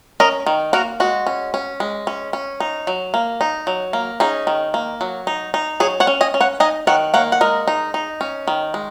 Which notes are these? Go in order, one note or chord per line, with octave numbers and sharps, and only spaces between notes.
C#4 A#4 D#5
D#3
A#3 F#4 A#4
G#3 F#4
C#4
C#4
G#3
C#4
C#4
D#4
F#3
A#3
D#4
F#3
A#3
C#4 D#4 G#4
D#3
A#3
F#3
D#4
D#4
F#3 G#4 C#5
C#5 F#5
C#4
D#5 G#5
C#4
C#5 F#5
D#4 D#5 G#5
D#3 C#5 F#5
A#3 C#5 F#5
F#5
G#3 A#4 D#5
D#4
D#4
C#4
D#3
G#3